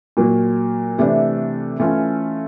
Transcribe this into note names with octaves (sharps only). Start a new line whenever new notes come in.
A#2 F#3 A#3
C3 E3 A3 D4
E3 A3 C#4 F4